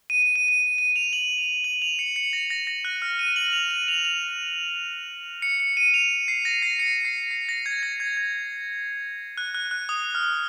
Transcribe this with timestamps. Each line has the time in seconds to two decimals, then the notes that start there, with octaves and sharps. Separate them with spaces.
0.10 D#7
0.23 D#7
0.36 D#7
0.48 D#7
0.78 D#7
0.96 F7
1.13 F#7
1.38 F7
1.64 F#7
1.82 F7
1.99 C#7
2.16 C#7
2.33 A#6
2.50 A#6
2.67 A#6
2.85 F#6
3.02 F6
3.19 D#7
3.36 F#7
3.53 F7
3.71 D#7
3.88 F7
4.05 F7
5.42 C#7
5.60 C#7
5.77 D#7
5.94 F7
6.28 C7
6.45 A#6
6.62 C7
6.79 C#7
7.05 C7
7.31 C7
7.49 A#6
7.66 G#6
7.83 A#6
8.00 G#6
8.17 G#6
9.38 F#6
9.55 F#6
9.71 F#6
9.89 D#6
10.15 F6